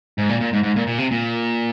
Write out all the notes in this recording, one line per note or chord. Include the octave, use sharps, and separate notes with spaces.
G#2
A#2
A#2
G#2
G#2
A#2
A#2
C3
A#2